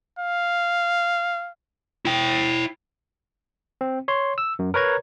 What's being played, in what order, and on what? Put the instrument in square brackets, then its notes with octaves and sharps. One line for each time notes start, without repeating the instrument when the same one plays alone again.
[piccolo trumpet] F5
[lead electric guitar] E4 G5
[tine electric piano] C4
C#5 C6
E6
F#2
A#4 B4 C#5 A#5 G#6